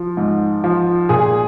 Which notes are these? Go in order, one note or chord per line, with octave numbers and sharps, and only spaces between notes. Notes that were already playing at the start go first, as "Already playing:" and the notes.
Already playing: F3
G#2
F3
A#2 G#4